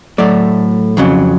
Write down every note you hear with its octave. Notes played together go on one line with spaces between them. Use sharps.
A2 F#3 A3 D5
F2 C#3 F#3